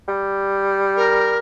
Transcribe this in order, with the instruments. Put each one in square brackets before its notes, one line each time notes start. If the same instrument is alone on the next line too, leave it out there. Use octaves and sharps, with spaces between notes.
[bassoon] G3
[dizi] A#4